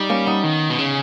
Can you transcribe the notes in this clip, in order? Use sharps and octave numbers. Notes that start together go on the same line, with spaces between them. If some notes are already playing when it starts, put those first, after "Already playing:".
Already playing: G3 D#4
A#3 C#4
B3 D#4
D#3
B2
C#3